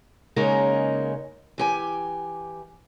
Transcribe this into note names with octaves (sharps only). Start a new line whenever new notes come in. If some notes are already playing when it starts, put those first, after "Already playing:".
C#3 G#3 A#3 C#4 D#4 A#4
E3 G4 G#5